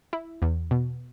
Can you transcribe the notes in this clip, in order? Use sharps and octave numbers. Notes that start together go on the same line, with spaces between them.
E4
E2
B2